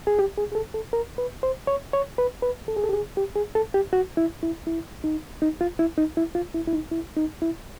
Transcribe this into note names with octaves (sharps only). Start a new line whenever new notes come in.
G#4
G4
G#4
G#4
A4
A4
A#4
B4
C5
C#5
C#5
B4
B4
A4
G#4
A4
G4
G#4
G4
G#4
A4
G4
F#4
E4
E4
E4
D#4
D#4
F4
E4
D#4
E4
F4
E4
E4
D#4
E4
D#4
E4